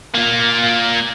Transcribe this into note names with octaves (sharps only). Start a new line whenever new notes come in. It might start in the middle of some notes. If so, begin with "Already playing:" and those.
A#3 F4